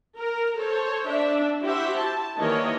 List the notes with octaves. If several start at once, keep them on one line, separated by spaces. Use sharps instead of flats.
A#4
A4 C5 C#5
D4 E5
E4 F#4 G4 C5 E5
A5
D#3 E3 G3 A#3 C#5 D#5